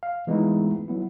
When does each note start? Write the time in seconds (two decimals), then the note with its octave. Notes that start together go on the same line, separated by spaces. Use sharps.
0.03 F5
0.27 E3 G#3 A3 B3 D#4 E4
0.88 F#3 B3 E4